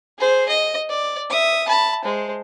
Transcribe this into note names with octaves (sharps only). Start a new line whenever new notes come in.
G#4 C5
D#5
D5
E5 D#6
A5 B5
G#3 C5